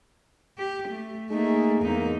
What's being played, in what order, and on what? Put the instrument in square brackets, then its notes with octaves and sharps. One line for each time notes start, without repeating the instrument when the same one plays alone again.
[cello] G4
A3
[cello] A3 A#3 [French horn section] D#4 G#4
[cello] E2 D#4 [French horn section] G#3 A#3